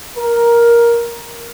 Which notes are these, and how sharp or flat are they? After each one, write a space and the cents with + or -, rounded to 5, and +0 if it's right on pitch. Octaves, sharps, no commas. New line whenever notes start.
A#4 +10